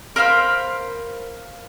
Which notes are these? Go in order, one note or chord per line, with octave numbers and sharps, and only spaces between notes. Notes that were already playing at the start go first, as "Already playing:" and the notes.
A#4 C5 F5 B5